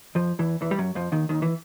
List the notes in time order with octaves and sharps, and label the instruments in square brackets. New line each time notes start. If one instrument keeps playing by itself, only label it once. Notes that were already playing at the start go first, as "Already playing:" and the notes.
[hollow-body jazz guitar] F2 F3
E2 E3
E2 E3
G3
F#2 F#3
F2 F3
D#2 D#3
D#2 D#3
E3